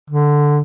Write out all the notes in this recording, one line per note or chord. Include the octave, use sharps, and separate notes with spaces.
D3